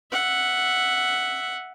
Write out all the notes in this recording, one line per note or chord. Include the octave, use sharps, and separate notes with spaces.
E5 F#5